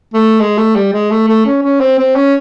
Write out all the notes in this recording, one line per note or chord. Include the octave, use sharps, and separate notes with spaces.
A3
G#3
A3
G3
G#3
A3
A3
C#4
C#4
C4
C4
C#4